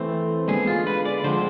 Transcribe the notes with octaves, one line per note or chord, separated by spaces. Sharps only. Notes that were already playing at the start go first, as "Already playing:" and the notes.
Already playing: E3 A3 C4
D3 G#3 B3 G#4
F4
B4
D5
D3 F3 G#3 C4 C5